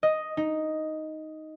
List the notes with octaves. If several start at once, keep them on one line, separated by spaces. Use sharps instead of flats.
D#5
D#4